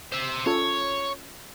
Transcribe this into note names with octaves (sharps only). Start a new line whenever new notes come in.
C5 E5
C#4 F4 A4 C#5